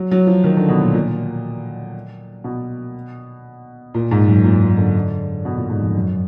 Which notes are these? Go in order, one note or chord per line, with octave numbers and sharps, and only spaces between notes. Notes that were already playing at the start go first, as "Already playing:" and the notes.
Already playing: F#3
F#3
F3
D#3
D3
B2
A#2
A#2
B2
A#2
G#2
F#2
A#2
A#2
D3
B2
A#2
G#2
F2
F#2